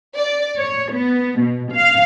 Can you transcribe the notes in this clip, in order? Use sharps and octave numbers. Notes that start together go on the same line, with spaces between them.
D5
C#5
B3
B2
F5